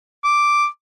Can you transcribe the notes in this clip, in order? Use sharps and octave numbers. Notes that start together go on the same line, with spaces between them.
D6